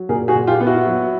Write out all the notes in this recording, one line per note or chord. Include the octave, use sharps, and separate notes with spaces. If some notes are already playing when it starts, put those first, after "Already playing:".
Already playing: F#3
A#2 G#4 A#4
F#4 G#4
A#2
F4 G4
B3
E4 F#4
F#3